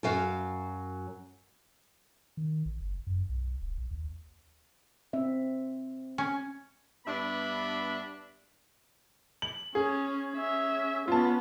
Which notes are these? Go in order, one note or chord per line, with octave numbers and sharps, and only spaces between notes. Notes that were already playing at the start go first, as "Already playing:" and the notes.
F#2 F#3 F5
D#3
A1
F#1
F#2
B1
D1
A#1
D#2
C4 E5
C#4
G2 B3 D4 E5 B5
F#7
C#4 G#4
C#4 E5
B3 C#4 F4 A5